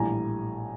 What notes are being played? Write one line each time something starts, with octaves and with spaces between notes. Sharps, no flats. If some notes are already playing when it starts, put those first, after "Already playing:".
Already playing: A#1 A2 E3 G3 G#5 A#5